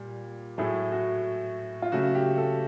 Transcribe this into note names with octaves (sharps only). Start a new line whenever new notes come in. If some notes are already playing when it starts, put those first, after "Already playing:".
Already playing: A#2 G3
A2 F#3 A3 G#4
F#4
F4
C#3 F#3 A3 F#4
G4
A4